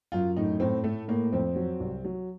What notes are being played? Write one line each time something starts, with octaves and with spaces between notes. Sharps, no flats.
F#2 F4
A2 D#4
A2 C4
A2 A3
A2 A#3
F2 C4
F#3
C2
F#3